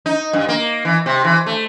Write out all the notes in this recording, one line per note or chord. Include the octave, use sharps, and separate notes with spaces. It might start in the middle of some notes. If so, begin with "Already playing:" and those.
D#4
G2
A#3
E3
C3
E3
A3